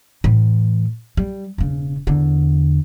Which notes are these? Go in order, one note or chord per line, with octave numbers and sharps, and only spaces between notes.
A2 E3
G3
E1 C#3
E2 D3